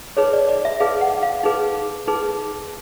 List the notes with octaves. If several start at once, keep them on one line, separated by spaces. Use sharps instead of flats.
D#4 G#4 B4 C#5
D5
D5
E5
D#4 G#4 B4 F5
F#5
F5
D#4 G#4 B4
D#4 G#4 B4